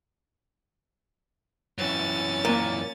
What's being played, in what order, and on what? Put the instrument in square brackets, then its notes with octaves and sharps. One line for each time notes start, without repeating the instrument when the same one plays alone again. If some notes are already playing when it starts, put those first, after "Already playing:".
[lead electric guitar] F#2 E3 [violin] C#4 A6
[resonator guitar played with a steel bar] A#2 [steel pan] A#3 A#4